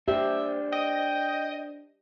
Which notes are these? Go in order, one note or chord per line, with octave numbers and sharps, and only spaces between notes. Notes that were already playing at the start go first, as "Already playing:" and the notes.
D4 G4 C5 E5
D#5 G5